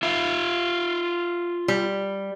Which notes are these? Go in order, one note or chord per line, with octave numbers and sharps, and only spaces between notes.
F4 E5
G3